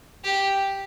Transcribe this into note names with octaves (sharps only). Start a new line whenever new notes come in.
G4